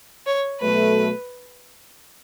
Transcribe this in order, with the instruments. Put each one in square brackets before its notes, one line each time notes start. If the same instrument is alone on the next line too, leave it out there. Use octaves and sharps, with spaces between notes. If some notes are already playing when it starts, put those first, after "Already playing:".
[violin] C#5
[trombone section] B2 F#3 A3 [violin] B4